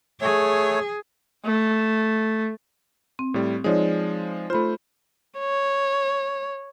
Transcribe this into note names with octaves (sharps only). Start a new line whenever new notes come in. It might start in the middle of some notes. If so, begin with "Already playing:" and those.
A3 G#4 C#5
A3
C4
A2 G3
F3 G#3 D#4 C#5 D5
A3 F4 C5 B5
C#5